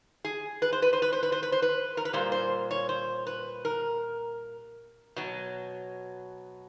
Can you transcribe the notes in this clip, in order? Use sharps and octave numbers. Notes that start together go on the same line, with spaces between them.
G#4
B4
C5
B4
C5
B4
C5
B4
C5
B4
C5
B4
A#4
B4
A#2 G3 A#3 C5
C5
C#5
C5
B4
A#4
B2 F#3